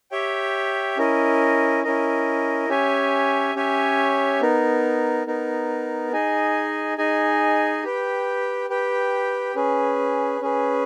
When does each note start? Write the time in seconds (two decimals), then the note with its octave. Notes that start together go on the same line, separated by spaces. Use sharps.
0.11 G4 C#5 E5 G5
0.97 C#4 E4 A#4 D#5
1.84 C#4 E4 A#4 D#5
2.69 C#4 G4 C#5 E5 G#5
3.55 C#4 G4 C#5 E5 G#5
4.41 B3 D#4 A#4
5.27 B3 D#4 A#4
6.12 D#4 G#4 D#5 G#5
6.98 D#4 G#4 D#5 G#5
7.83 G4 B4 G5
8.69 G4 B4 G5
9.55 C#4 G#4 B4
10.41 C#4 G#4 B4